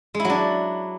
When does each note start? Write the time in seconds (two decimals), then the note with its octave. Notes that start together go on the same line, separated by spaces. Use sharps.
0.15 G#3
0.20 E4
0.25 F#3
0.30 D4